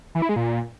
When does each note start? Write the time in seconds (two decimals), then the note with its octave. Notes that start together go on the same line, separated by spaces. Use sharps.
0.15 E3
0.22 E4
0.29 G#3
0.36 A#2